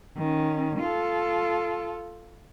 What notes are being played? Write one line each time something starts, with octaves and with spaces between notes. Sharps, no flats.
D#3 C#4
F4 A4